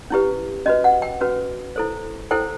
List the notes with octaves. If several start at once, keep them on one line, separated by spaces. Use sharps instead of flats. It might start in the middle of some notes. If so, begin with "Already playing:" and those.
C#4 E4 G4 B4
C#4 F#4 B4 D#5
F#5
G5
C#4 F#4 B4
E4 A4 C5
E4 A4 C5 G5